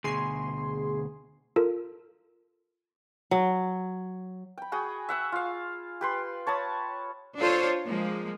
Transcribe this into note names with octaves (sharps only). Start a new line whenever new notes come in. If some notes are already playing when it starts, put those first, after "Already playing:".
D2 B2 G#4 C6
F4 A4 A#4
F#3
G5 B5
F#4 G#4 G5 D#6
E5 F#5 E6
F4 F5
G4 B4 C6
C#5 A5 B5 D#6
D4 F4 A4 C5 C#5
F3 G#3 A#3